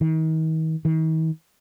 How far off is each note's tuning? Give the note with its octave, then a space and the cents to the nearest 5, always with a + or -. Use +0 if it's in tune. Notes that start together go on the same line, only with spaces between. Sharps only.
D#3 +40
D#3 +45